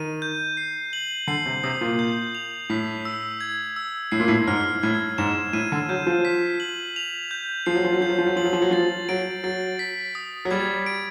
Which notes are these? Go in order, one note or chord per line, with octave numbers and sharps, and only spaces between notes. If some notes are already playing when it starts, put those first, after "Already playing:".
Already playing: D#3 D#7
G6
C7
F#7
D3 C7
C3
C3 D#6
A#2
G6
F7
A2 B6
E6
G#6
E6
A2 C7
A#2
A2
G#2 F6
A2 G#6
G#2 E7
A2 D#7
D3
F#3 G6
F3
B6
F#7
F7
G6
F3 C7
F#3
F3
F#3
F3 G6
F#3
F3
F#3
F3 F#7
F#3
F3
F#3
F3 A6
F#3 D7
F#3 A6
B6
D#6
F#3
G3 G#6
D7